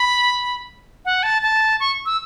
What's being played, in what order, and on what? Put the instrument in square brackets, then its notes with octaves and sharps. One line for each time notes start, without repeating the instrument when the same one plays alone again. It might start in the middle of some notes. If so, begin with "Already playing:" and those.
Already playing: [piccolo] B5
F#5
A5
A5
C#6
E6